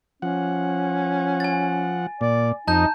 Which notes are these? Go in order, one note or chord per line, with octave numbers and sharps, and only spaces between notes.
F3 C#4 F#5
G#5 A6
A#2 D5
F2 D#4 D#5 A5 A#5 G6